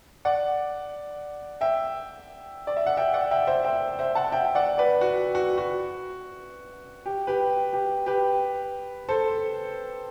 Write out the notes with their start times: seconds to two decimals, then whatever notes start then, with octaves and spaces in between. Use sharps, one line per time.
0.25 D5 F#5
1.61 E5 G5
2.67 D5
2.77 E5
2.86 F#5
2.97 E5 G5
3.14 D5 F#5
3.31 E5 G5
3.47 C5 E5
3.64 E5 G5
3.99 C5 E5
4.15 F#5 A5
4.32 E5 G5
4.45 G5
4.55 D5 F#5
4.78 B4 D5
5.01 F#4
5.35 F#4
5.58 F#4
7.06 G4
7.27 G4 B4
7.73 G4
8.06 G4 B4
9.09 A4 C5